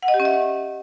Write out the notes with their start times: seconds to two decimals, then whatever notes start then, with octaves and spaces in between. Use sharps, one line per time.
0.03 F#5
0.08 D#5
0.14 G4
0.20 C#4
0.25 E5